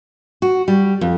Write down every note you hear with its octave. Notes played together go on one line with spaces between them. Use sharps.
F#4
G3
F2